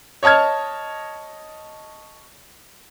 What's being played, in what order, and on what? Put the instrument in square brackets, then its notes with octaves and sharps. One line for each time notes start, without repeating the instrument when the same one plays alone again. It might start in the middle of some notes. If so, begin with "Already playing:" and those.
[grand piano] C#5 D#5 A5 F6 G#6